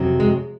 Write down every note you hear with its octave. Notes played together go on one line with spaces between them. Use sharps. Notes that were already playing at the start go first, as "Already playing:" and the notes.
Already playing: F2 C3 F#3
G#3